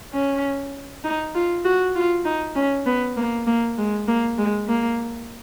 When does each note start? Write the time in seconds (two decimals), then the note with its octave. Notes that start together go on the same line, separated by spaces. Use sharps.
0.13 C#4
1.04 D#4
1.34 F4
1.65 F#4
1.95 F4
2.25 D#4
2.55 C#4
2.86 B3
3.17 A#3
3.47 A#3
3.78 G#3
4.07 A#3
4.38 G#3
4.68 A#3